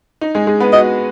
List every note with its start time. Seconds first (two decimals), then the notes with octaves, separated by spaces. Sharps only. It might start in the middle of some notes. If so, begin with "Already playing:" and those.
0.21 D#4
0.35 G#3 G#4
0.47 G#3 G#4
0.60 B3 B4
0.73 F#4 D#5